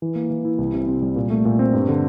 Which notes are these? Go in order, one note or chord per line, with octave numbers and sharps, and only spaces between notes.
E3
A#3
E3
E4
C2
C3
C4
G3
A#2
A3
A#2
C4
G2
D3